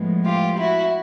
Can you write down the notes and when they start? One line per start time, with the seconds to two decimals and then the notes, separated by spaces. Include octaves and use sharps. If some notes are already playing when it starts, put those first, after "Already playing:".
Already playing: A2 F3 G#3 B3
0.25 F4 G4
0.58 E4 F#4